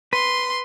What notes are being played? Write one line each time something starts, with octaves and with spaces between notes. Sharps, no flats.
B4 C6